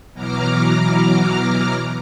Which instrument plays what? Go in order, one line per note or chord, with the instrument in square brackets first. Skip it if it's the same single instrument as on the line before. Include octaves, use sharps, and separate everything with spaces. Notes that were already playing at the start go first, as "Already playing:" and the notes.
[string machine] B2 E3 F#3 A#5 D6 F6